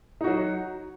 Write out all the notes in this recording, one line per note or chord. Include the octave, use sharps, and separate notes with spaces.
F#3 D#4 F#4